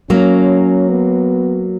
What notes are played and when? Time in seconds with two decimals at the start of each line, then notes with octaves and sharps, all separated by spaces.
0.10 F#3 A#3 C#4
0.90 B3